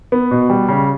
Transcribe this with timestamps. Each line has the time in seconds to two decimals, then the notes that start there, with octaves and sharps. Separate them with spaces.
0.12 B3
0.31 B2
0.50 G3
0.68 C#3